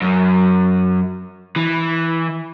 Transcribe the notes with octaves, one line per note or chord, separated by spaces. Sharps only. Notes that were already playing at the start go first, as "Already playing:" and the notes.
F#2
E3